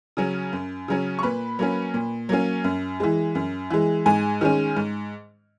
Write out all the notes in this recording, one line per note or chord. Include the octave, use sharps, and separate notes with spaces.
C#3 F#3 C#4
F#2
C#3 F#3 C#4
C#6
A#2 B4 B5
F#3 A#3 C#4
A#2
F#3 A#3 C#4
F#2
E3 G#3
F#2
E3 G#3
G#2 G#4 G#5
D#3 G#3 C#4
G#2